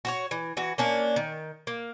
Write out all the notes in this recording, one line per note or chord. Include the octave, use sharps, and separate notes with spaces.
F#4 B4 C#5
E3
E3 F#4
A#3 C#4 D4
D#3
A#3